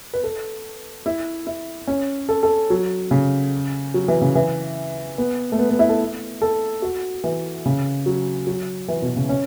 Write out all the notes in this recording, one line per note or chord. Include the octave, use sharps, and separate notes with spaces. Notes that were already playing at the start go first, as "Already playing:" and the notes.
B4
A4
E4
E4
C#4
A4
A4
F#3
C#3
F#3
E3
C#3
E3
B3
A3
B3
B3
E4
A4
A4
F#4
E3
C#3
F#3
F#3
E3
B2
C#3
C#4